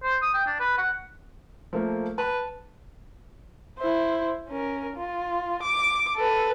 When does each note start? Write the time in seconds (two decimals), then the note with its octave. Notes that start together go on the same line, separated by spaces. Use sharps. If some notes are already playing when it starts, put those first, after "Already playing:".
0.04 C5
0.22 D#6
0.34 G5
0.47 D4
0.60 B4
0.79 F#5
1.73 F3 A3 A#3
2.18 B4 A5
3.79 E4 C5
4.48 C#4 A#4
4.96 F4
5.62 D6
6.17 A4 B4